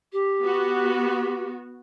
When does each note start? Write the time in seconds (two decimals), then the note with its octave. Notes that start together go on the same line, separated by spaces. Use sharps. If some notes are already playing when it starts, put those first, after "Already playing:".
0.12 G4
0.42 B3 F#4